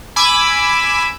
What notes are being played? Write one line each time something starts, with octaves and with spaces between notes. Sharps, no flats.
G#5 B5 D6 E6